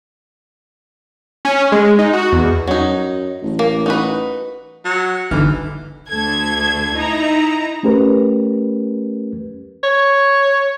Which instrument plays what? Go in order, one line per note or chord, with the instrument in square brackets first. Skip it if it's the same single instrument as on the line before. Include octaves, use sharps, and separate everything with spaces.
[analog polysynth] C#4
G#3
D#4
F#4
E2
[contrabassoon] F#2 [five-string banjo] F#3 D#4
[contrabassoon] A1
[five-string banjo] A#3
D#4 F#4 B4
[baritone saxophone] F#3
[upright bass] G1 [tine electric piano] D3 D#4 F6 [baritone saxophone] E3
[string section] D2 A4 G#6
D#4 E4 A#5
[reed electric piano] A3 C#4 G4 A#4 B4
[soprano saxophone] C#5